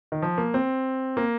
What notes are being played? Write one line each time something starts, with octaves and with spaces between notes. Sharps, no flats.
D#3
F3
A#3
C4
A#3